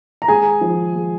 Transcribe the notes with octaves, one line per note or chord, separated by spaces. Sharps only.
A#5
G#3 G#4 G#5
F3
G#3